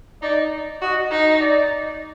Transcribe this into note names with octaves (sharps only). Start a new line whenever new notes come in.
D#4 D5
F#4 D#5
D#4
D5